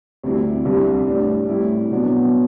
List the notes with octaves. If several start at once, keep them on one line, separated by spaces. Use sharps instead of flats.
D2 C3 G3 C4 E4
C2 C3 G3 D4
A2 G3 D4
A2 G3 C4 E4
B2 F#3 B3 D4